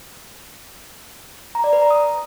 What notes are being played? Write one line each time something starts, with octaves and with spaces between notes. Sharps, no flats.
A#5
D5
B4
A#5
D#6